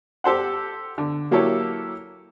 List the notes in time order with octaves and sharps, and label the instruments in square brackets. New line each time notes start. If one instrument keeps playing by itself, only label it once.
[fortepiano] G4 A4 C5 F#5
D3
F#3 A#3 E4 G4 A4 C#5